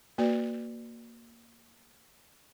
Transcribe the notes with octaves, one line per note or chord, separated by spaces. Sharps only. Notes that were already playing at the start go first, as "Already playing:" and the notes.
A#3 F#4 B4 D5